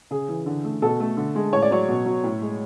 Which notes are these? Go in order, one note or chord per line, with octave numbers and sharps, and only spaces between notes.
C#3 G#4
E3
D3
A3
B2 A4
A3
D3
G#3
A2 C#5
D5
F#3 C#5
B2
F#3
A2
G#3